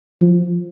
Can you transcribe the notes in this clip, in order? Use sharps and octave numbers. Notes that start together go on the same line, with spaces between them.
F3